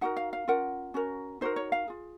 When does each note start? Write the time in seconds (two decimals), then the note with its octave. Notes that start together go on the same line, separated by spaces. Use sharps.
0.01 D#4 F#4 A#4 F#5
0.17 F5
0.33 F5
0.48 C#4 F4 A#4 F#5
0.94 C#4 F#4 A#4
1.41 D#4 F#4 A#4 C5
1.56 C#5
1.72 F5
1.88 F4 G#4